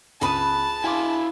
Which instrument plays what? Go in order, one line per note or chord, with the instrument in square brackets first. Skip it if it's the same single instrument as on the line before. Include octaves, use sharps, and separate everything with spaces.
[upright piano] C#2 D#6 D#7 [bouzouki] G#4 B4 [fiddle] A5
[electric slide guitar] E4 E5 F5 [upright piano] G#5 C6 D6